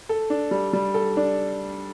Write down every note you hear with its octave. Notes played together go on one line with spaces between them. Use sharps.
A4
D4
G3
G3
A4
D4